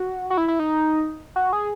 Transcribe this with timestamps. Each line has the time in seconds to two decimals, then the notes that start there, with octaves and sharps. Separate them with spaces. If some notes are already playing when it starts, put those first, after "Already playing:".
Already playing: F#4
0.30 F#4
0.37 E4
0.48 E4
0.59 D#4
1.36 F#4
1.53 G#4